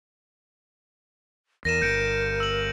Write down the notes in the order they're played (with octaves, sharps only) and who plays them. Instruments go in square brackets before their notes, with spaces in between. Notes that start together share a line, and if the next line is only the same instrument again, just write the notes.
[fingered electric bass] E2 [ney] A#4 [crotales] A#6 D#7 E7
[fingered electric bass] G1 [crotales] G6 C#7 D7
[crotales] E6 F#7